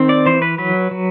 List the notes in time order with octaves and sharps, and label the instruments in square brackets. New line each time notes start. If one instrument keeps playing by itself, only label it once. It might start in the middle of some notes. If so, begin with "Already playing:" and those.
Already playing: [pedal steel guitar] D#3 C4
D5
E3 C5
B4
F#3 B4
F#3